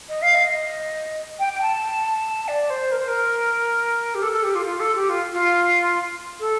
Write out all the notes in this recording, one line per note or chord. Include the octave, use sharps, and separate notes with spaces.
D#5
F5
D#5
G5
G5
A5
D5
C5
A#4
C5
A#4
G4
A4
A4
G4
F4
F4
A4
G4
F4
F4
A4